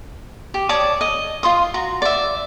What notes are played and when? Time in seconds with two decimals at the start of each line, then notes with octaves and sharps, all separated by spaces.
0.54 G4
0.69 C#5 D5 A5 D#6
1.01 D#5
1.43 F4 C6 D#6
1.74 F#4 A#5
2.02 D5 E5